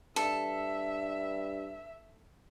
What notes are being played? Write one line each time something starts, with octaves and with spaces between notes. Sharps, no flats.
G2 A4 E5